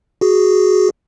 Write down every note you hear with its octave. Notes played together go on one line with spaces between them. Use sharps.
F#4 G#4